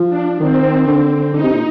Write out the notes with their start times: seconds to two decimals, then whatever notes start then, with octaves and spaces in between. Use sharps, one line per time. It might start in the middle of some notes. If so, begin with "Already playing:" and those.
Already playing: F3
0.09 D4
0.40 D#3 C4
0.87 D3
1.32 D3 D#4
1.43 C3
1.54 A#2